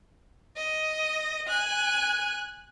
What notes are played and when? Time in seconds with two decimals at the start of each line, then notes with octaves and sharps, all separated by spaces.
0.57 D#5
1.48 G#5 F#6